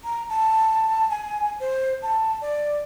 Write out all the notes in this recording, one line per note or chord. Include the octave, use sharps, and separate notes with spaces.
A#5
A5
G#5
C5
A5
D5